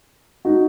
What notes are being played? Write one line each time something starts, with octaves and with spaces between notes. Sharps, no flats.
D#4 F#4